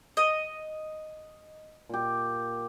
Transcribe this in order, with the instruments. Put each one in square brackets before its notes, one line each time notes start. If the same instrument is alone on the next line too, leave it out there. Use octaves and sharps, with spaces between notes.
[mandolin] D#5
[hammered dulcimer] A#2 G4